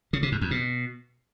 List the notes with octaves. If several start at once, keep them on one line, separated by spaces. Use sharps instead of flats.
C#3
C3
G#2
F2
B2